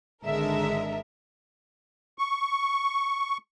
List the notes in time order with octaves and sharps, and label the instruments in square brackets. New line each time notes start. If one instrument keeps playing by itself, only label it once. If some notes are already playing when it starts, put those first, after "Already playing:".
[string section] G#1 D3 G#3 A4 A#4 E5
[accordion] C#6